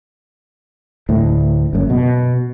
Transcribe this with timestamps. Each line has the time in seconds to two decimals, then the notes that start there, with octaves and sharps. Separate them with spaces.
1.09 D2 A2
1.73 F#1 F#2
1.90 B2